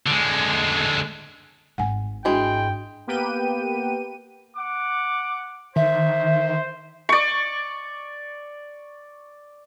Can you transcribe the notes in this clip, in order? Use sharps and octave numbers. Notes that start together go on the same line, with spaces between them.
D3 G#3
G#1 G#2 F#5 G#5
E3 G#3 D4 F#4 G5
A#3 B3 G4 B4 G5 D#7
F#5 D6
D#3 C5 E5
D5 C#6